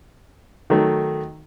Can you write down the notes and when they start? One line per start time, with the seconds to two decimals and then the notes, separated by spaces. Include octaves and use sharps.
0.70 D#3 F#3 A3